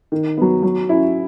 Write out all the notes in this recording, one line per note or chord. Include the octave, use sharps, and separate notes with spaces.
D#3
F#3 B3
F#3
C#4 E4